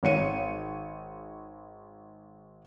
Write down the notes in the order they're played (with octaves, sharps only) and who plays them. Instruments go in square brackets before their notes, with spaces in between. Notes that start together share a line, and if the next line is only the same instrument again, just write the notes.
[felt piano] G#1 C#5 C#7 D#7